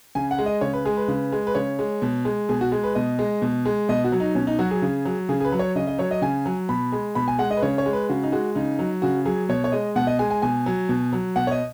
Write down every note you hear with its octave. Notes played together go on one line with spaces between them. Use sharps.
C#3 G#5
F#5
G#3
D#5
C#3 C#5
B4
G#3 G#4
B4
C#3
G#3
B4
C#3 C#5
G#3
B2
G#3
B2 G#4
F#4
G#3
B4
B2 D#5
G#3
B2
G#3
B2 D#5
F#4
F#3
D#4
B2 C#4
D#4
F#3 F#4
G#4
C#3 G#4
F#3
C#3 G#4
G#4
B4
F#3
C#5
C#3 D#5
D#5
F#3 C#5
D#5
C#3 G#5
F#3
B2 B5
G#3
B2 B5
G#5
G#3 F#5
D#5
B4
C#3 C#5
C#5
G#3
B4
C#3 F#4
D#4
G#3 F#4
C#3 D#4
F#3
C#3 F#4
F#3 G#4
B2 C#5
C#5
G#3 D#5
B2 F#5
D#5
G#3 G#5
G#5
B2 G#5
F#3
B2
F#3
B2 F#5
C#5
D#5